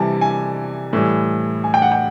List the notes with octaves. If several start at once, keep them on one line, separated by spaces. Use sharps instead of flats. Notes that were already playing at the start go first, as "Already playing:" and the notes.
Already playing: C3 E3 G3 G#5 A5
G#5
A2 E3 G3
G#5
G5
F#5
G5